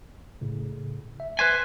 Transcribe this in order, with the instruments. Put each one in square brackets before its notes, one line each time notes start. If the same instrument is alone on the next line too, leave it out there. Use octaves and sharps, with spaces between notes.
[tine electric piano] A2 C#3
E5
[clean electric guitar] B4 C5 G#5